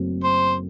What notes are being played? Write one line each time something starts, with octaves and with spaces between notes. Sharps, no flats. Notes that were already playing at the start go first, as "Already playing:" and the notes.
Already playing: F#1 F#2 F#3 A3 C4
C5